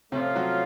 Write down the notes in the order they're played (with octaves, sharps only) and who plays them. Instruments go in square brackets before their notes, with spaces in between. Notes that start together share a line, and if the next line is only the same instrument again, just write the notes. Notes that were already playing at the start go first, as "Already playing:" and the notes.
[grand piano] C3 C4 [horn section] F3 A3 C#4 F4
[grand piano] F#3 F#4